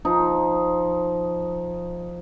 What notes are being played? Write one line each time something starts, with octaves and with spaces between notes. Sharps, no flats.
F3 D#4